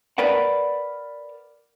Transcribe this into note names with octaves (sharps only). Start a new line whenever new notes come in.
A#4 B4 D5 F#5